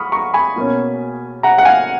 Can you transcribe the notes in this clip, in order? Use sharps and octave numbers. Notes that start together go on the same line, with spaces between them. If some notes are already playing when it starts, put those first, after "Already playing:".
Already playing: B5 C#6 D#6 F6
A#5 C#6
G#5 B5
B2 A#3 C#4
F#5 A#5
F#5
F5 G#5